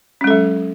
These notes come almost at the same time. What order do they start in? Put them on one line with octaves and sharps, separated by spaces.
C#4 G#3 A4 F#3